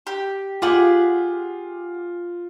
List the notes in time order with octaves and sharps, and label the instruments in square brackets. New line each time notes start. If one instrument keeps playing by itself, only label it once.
[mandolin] G4
[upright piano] F4 [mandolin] G4 G#4 F#5